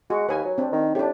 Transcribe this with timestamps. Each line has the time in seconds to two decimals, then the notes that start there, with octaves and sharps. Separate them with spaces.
0.10 G#3 F#4
0.29 D#2 B4 G#5
0.44 F#3
0.58 C4 D4
0.72 D#3
0.95 A2 D4 G4